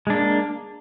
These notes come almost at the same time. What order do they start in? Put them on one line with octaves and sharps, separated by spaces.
G#3 D4 A#3